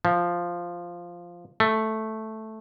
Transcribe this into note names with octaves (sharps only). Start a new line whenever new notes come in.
F3
A3